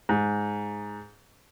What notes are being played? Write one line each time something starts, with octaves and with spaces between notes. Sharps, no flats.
G#2